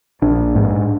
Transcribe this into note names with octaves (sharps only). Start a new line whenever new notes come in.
A#1 D4
G#2